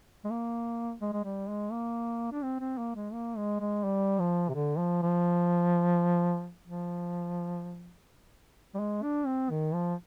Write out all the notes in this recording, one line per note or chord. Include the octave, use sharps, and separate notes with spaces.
G#3
A#3
G#3
G#3
G3
G#3
A#3
D4
C4
C4
A#3
G#3
A#3
G#3
G#3
G3
F3
C3
D3
F3
F3
F3
G3
G#3
D4
C4
D#3
F3